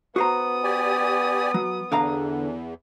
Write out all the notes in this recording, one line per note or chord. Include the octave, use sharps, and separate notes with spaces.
B3 F#4 C5 A#5 D#6
G4 D5 G#5
F#3
E2 D3 F5 A#5